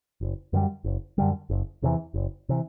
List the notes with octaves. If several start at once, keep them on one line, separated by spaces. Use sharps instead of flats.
F#1
F#2 D3 G3
F#1
F#2 D3 G3
F#1
E2 C3 E3
F#1
C3 E3